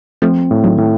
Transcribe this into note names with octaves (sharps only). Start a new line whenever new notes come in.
F3 A3 C4
A2
D#3 F#3
A2